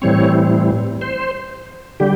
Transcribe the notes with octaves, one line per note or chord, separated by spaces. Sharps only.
A2 E3 G3 C4 C#5
C5
D3 G3 G4